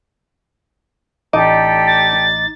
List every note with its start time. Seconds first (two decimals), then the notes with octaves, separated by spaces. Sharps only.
1.33 A1 D#4 G4 A4 D5 D#5 D6
1.87 A6